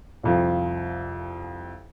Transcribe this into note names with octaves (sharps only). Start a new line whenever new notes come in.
C2 F2 F3